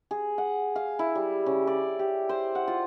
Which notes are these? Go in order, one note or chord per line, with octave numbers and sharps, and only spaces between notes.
G#4
F#5
F5
E4
G3
C#3
D5
G4
C5
F#5
F4